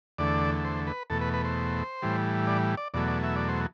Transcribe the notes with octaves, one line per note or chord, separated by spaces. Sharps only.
E2 D3 A3 D5
C5
B4
E2 B2 A3 A4
B4
B4
C5
A2 E3 G3
D5
D5
E2 B2 F#3 A3 D5
D5
E5
D5
C5